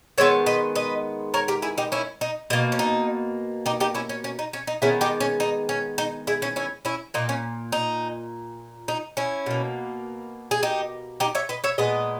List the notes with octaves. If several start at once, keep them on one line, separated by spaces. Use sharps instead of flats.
D#3 G#3 B3 C#5 E5
B4 D#5
B4 D#5
A#4 C#5
G4 A#4
E4 G#4
D#4 G4
C#4 E4
D#4
B2 A#3 D#4
C#4
D#4
D#4 G4
D#4 G4
C#4 E4
C#4
C#4
D#4
C#4
D#4
D#3 G#3 B3 C#4 E4
D#4 G4
C#4
D#4
C#4
D#4
E4 G#4
C#4 E4
C#4 E4
C#4 E4
A#2 A#3 D#4
C#4
D#4
D#4
C#4 E4
B2 A#3
G#4
D#4 G4
D#4 G4
C#5 E5
B4 D#5
C#5 E5
A#2 G#3 B3 B4 D#5